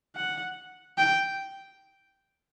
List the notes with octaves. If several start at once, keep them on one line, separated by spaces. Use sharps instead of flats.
F#5
G5